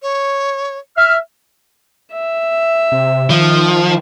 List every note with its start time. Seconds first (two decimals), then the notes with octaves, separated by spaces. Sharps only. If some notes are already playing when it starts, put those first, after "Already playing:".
0.02 C#5
0.98 E5 F6
2.12 E5
2.92 C3
3.30 D#3 F3